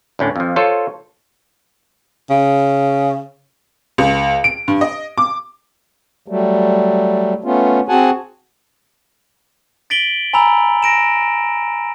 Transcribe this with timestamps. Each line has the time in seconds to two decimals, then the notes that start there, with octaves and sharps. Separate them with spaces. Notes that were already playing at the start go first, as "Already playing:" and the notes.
0.19 D2 A2 C#4 D4
0.36 F2 F3
0.56 F4 A4 C5 C#5
2.30 C#3
3.98 C#2
4.44 D7
4.68 G2
4.81 D#5
5.18 D6
6.28 F#3 G3 A3
7.44 A3 B3 C#4 F4
7.89 C4 F#4 G#4 F#5 G#5 A5
9.90 A6 B6 D7 F#7 G7
10.33 G#5 A#5 B5 E6 F7
10.83 A#6 D7 E7